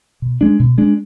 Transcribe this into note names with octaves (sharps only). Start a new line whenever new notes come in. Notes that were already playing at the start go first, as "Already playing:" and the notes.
B2
G#3 D4
B2
G#3 D4